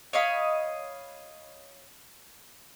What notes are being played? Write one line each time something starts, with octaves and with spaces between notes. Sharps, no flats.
C#5 D#5 F5 B5